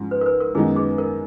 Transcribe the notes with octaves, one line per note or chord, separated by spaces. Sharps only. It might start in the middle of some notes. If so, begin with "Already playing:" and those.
Already playing: G#2 F3 G#3 C#4
B4
A#4
B4
A#4
F#2 D#3 G#3 B3 D#4 G#4
G#4
A#4